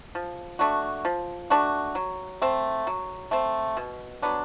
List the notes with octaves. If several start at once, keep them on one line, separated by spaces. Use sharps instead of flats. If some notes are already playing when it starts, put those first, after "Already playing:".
F3
A3 D4 F#4
F3
A3 D4 F#4
F#3
A3 C4
F#3
A3 C4
B2
F#3 B3 D4